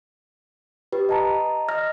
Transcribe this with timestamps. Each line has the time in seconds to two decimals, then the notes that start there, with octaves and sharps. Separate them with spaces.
0.92 G4 B4
1.09 D#5 A5 A#5
1.69 D#5 F6 A#6